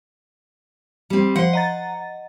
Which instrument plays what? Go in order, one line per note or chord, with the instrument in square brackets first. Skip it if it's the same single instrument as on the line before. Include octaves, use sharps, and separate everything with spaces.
[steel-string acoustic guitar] G3 C4
[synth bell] F3 C5 [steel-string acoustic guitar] F#5
[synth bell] D#5 A#5 A6